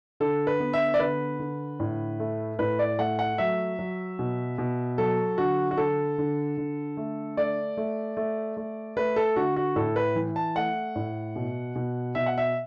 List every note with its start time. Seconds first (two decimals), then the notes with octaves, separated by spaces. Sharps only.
0.20 D3 A4
0.47 B4
0.60 B3
0.73 E5
0.94 D5
0.99 D3 B4
1.39 D3
1.80 A2
2.20 A3
2.59 A2 B4
2.79 D5
2.99 A3 F#5
3.19 F#5
3.38 F#3 E5
3.79 F#3
4.19 B2
4.58 B2
4.98 F#3 A4
5.38 D3 F#4
5.71 F#4
5.77 D3 A4
6.18 D3
6.57 D3
6.97 A3
7.37 A3 D5
7.77 A3
8.17 A3
8.57 A3
8.97 A3 B4
9.16 A4
9.36 D3 F#4
9.56 F#4
9.76 A2 A4
9.96 B4
10.16 E3
10.36 A5
10.56 A3 F#5
10.95 A2
11.36 B2
11.75 B2
12.15 B2 E5
12.26 F#5
12.38 E5